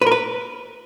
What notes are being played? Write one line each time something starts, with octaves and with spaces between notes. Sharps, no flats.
B4
A#4
B4